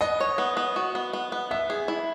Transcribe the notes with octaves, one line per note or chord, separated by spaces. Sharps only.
B3 D#5
C#5
B3
B3
F#4
B3
B3
B3
B3 E5
G#4
E4